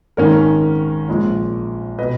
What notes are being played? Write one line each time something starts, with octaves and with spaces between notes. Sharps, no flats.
G#1 G#2 D#3 A#3 C#4 A#4 C#5
A#1 A#2 G#3 C#4
B2 B4 D#5